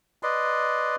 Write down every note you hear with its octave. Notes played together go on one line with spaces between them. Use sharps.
B4 D5 D#5 C6